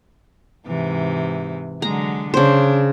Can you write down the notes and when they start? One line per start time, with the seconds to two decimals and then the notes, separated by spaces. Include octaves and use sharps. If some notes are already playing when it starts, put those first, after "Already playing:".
0.67 G#2 C3 E3
1.82 D3 F#3 G#3 A#5
2.34 C#3 D4 C5